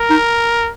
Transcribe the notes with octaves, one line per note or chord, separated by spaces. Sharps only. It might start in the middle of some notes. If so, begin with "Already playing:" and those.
Already playing: A#4
D#4